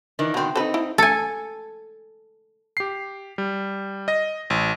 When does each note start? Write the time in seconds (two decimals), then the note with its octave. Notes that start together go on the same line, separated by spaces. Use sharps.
0.19 D#3 E3 D4
0.34 B2 D#3 F#3 C4
0.55 C4 D#4 A4 B4
0.74 E4
0.98 A4 G#5
2.77 G4 C7
3.38 G3
4.08 D#5 A#6
4.50 A1